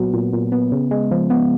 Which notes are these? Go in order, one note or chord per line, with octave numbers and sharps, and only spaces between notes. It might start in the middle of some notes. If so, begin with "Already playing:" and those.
Already playing: A#2 F#3 B3
A#2
A#2
B3
C#3
G#3
F3
B3